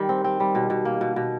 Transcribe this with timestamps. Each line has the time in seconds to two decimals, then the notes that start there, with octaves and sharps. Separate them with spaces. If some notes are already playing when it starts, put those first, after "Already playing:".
Already playing: D#3 G3
0.09 C4
0.24 C4
0.40 G3
0.55 B2
0.70 B2
0.85 A#3
1.01 B2
1.16 B2